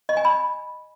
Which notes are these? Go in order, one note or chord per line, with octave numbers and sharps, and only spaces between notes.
D#5
G#5
B5